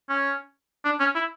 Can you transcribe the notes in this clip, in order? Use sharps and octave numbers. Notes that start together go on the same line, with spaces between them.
C#4
D4
C#4
E4